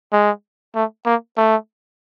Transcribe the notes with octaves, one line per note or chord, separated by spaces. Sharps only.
G#3
A3
A#3
A3